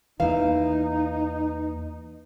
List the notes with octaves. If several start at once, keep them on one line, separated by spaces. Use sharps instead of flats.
E2 E3 A#3 D#4 B4 F5